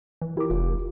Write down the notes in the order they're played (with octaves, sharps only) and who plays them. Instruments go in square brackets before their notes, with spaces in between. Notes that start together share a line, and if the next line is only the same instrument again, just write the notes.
[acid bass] E3
[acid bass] E4 [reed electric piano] G4 A#4 D6
[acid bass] F1 [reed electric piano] F4